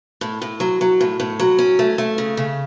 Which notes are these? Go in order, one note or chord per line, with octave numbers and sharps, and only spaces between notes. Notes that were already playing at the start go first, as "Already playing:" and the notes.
A2
A2
F#3
F#3
A2
A2
F#3
C#4
A3
A3
C#3
C#3